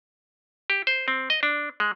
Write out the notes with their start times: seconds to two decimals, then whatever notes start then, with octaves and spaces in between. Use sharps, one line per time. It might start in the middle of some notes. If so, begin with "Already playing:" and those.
0.70 G4
0.87 C5
1.08 C4
1.30 D#5
1.43 D4
1.80 G#3